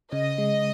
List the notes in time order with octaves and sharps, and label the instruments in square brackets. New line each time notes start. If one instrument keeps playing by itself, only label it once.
[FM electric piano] C#3 [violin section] D#5
[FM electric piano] G#3